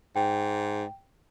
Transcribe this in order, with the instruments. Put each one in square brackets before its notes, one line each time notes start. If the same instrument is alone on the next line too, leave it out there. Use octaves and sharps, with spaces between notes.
[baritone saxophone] G#2 [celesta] G5